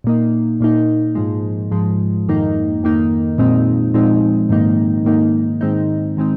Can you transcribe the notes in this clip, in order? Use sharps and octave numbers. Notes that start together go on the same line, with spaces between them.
A#2 A#3 D#4
A#2 A#3 D#4
G#2 F3 G#3
G#2 F3 G#3
F2 D#3 A#3 D#4
F2 D#3 A#3 D#4
A#2 F3 G#3 C4 D#4
A#2 F3 G#3 C4 D#4
G#2 D#3 A#3 D#4
G#2 D#3 A#3 D#4
G#2 D#3 G#3 C4 D#4
D#3 G#3 C4 D#4